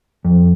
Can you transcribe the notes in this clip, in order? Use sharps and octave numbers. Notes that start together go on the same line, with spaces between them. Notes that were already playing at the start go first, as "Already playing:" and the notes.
F2